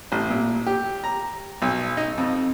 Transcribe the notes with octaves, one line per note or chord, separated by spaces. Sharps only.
A1
A#2
G4
A#5
B1
D#4
F2